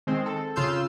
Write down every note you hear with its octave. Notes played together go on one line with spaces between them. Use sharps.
D#3 G#3 C4
A4
C#3 F4 C6 E6 G6